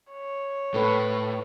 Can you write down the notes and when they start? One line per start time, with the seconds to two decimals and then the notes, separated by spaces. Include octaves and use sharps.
0.13 C#5
0.74 A2 A4 B4